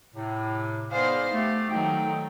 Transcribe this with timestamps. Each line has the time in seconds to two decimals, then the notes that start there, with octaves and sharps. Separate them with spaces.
0.15 A2 C3
0.92 B3 D#4 G#4 C5 D5 F5
1.33 A3 G4
1.70 D#3 F#3 A3 D#4 G5